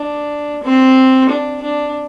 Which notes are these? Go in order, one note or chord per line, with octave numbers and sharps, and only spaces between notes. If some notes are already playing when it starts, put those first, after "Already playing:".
Already playing: D4
C4
D4
D4